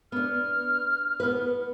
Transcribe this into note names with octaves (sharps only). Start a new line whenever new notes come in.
B3 D4 F6
B3 B4